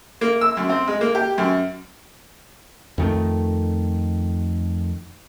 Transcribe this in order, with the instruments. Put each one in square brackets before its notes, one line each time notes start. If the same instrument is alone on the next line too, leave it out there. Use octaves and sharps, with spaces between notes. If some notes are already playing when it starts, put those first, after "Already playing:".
[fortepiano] A#3
E6
F#2
C4
G#3
A#3
G4
F#2
[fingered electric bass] F2 D#3 A3